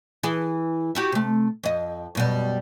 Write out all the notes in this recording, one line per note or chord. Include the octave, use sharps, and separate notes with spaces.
E3 G#4
E4 F#4 G4
C3 A3
F2 D#5
F#2 B2 G3